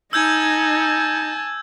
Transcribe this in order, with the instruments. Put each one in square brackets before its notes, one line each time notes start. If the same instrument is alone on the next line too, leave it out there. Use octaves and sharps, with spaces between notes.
[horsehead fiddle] D#4 [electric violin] G#5 A5 [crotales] E6 G6 G#6